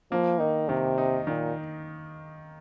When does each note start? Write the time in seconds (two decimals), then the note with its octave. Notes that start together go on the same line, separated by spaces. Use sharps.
0.12 F3 A#3
0.40 D#3 D#4
0.68 C3 D#3
0.98 D#4
1.27 A#2 D#3